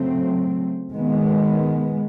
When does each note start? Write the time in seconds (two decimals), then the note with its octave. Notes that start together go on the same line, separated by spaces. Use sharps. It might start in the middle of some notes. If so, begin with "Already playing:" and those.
Already playing: C#3 F#3 A3 C4
0.91 D#3 G#3 B3